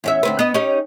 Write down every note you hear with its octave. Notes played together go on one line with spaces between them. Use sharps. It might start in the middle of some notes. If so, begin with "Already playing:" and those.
E2 C#4 E5
D2 C4 B4
B3 D#5
C#4 D#4 G4